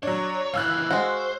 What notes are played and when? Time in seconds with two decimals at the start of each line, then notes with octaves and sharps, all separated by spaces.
0.03 F#3 D4 C#5
0.54 C#2 E3 F5 E6 F#6
0.91 G#3 F#4 C5